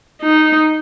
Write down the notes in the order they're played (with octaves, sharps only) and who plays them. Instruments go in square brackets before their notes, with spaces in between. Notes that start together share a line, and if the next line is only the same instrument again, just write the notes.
[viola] D#4